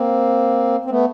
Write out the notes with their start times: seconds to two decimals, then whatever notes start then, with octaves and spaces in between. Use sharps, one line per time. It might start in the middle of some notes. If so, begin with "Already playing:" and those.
Already playing: A#3 C4
0.85 C4
0.90 A3 B3